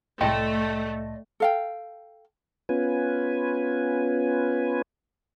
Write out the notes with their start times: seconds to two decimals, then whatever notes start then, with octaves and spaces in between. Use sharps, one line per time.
0.21 C2 A2 A3 D5 D#5 G5 A5 C6
1.40 A4 F5 G5
2.69 B3 C#4 F4 B4 G#5